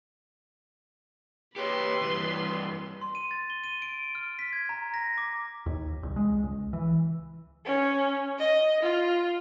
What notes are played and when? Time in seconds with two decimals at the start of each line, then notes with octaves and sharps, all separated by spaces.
1.56 G4 B4 C#5 C6
2.02 G2 E3
3.01 C6
3.15 D#7
3.31 A6
3.50 G7
3.64 D#7
3.82 D7
4.15 F6
4.39 B6
4.53 G#6
4.69 A#5
4.94 A#6
5.18 D6
5.66 D#2
6.03 C2
6.16 G#3
6.43 C#2
6.73 E3
7.66 C#4
8.38 D#5
8.83 F4